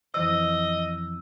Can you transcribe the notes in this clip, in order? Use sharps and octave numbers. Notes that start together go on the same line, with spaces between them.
F2 E3 C5 D#5 E6